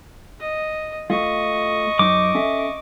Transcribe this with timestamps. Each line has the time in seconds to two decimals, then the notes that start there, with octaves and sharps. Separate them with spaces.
0.40 D#5
1.10 A3 F4 D#5 C#6
1.99 F#2 D#4 D6
2.35 C#4 A4 E5